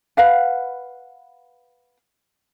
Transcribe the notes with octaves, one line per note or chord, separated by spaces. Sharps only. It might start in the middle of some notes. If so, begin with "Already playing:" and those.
B4 F5 F#5